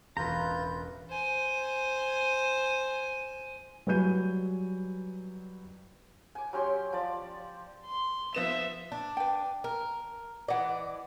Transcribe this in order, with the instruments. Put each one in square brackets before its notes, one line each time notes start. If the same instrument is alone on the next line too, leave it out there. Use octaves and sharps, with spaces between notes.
[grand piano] E1 A1 [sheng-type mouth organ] F4 G6 [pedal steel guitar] B4 A#5
[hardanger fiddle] C5 G#5
[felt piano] F#3 G3 B4 G#5 G6 D#7
[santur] G#5 D6
F#3 C#4 G4 C6
F3 D5
[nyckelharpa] C6
[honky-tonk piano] F3 B3 E7 [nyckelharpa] E5
[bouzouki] D4
[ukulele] B4 G5
[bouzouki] A#4
[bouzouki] E3 D5 [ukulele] D#5 F#5